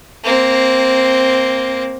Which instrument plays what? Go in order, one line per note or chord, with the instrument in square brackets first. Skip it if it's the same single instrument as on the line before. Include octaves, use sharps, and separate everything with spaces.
[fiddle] A#3 C4